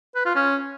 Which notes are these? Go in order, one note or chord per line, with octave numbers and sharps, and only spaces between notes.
B4
F4
C#4